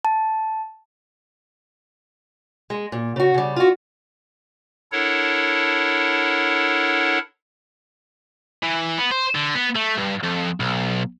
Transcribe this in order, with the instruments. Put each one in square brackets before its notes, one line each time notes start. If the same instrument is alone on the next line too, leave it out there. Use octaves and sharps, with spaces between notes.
[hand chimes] A5
[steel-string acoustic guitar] G#3
A#2
C#3 F#4
C#3 G3
F4 F#4
[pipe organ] D4 E4 A4 A#4 C#5 F#5
[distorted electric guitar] E3
B3
C5
D3
B3
A3
G2
F2
B1